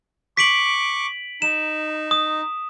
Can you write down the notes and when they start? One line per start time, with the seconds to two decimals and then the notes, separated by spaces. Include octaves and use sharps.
0.37 C#6 D6 B6 D7 F#7
1.42 D#4 E7
2.11 D#6